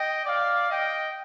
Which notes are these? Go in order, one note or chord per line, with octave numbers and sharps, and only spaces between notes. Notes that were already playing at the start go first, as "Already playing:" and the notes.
Already playing: D#5 G5
D5 F5
D#5 G5